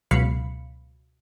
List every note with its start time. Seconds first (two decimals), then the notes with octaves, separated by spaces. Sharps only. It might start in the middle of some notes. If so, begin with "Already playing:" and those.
0.11 C#2 B2 F#3 F5 B5 C#7